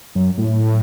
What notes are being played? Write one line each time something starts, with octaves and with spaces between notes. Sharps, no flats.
F#2
A2